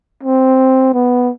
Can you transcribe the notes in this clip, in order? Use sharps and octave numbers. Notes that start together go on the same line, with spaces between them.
C4
B3